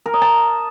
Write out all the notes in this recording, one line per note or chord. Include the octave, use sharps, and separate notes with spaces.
A#4
D#5
A5